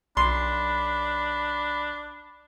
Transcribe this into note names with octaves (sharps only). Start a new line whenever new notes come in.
B1 D4 B5 C6